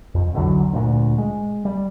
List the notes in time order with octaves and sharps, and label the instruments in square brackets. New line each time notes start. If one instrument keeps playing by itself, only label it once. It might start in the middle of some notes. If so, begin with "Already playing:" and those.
[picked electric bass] F2
B1 E2 D3 F#3
D2 A#2
G#3
G3